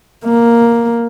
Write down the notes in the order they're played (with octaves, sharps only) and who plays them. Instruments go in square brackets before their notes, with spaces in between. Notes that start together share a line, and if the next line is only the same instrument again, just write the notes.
[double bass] A#3